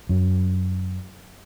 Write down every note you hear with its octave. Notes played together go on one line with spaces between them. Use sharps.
F#2